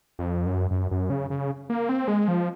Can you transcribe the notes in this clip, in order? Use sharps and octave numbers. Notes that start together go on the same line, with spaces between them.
F2
F#2
F#2
F#2
C#3
C#3
A#3
C4
G#3
F3